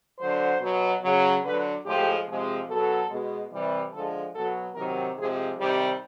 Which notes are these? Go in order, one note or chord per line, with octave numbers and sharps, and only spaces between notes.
D3 F#3 C5
B2 F#3
C#3 F#3
D3 F#3 B4
A2 F3 G#3 G4
C3 F3 G#3
B2 F#3 A4
B2 G#3
C3 E3 G3
D3 F3 G#3 A4
B2 F#3 A4
C3 D#3 F#3 A#4
C3 F3 G#3 G#4
C3 D#3 G3 G4